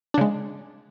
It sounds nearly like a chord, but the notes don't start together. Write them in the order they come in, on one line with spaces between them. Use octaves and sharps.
D4 C#3 G#3